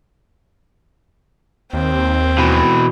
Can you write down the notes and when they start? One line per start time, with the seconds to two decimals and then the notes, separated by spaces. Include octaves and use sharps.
1.73 D#2 C4
2.38 B2 E3